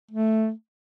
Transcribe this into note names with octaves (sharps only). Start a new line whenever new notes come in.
A3